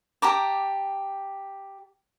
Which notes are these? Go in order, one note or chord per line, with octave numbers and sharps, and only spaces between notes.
G4 A5 A#5 D6